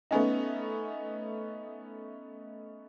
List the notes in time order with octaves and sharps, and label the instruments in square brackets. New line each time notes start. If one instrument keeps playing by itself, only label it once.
[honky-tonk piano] A3 B3 C#4 D#4